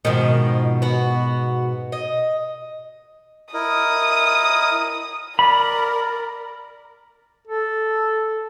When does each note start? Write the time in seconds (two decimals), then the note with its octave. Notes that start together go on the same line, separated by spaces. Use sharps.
0.05 G#2 B2 D#3 F3
0.82 B3 F#4
1.92 D#5
3.54 E4 A#4 D#5 D#6
5.39 A#4 D5 B5
7.48 A4